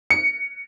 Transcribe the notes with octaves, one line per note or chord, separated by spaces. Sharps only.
C#7